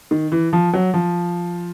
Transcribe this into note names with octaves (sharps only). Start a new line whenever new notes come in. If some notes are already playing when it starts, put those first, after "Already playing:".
D#3
E3
F3
F#3
F3